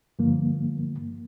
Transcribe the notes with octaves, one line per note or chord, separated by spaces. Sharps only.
G2 D3 F3 A#3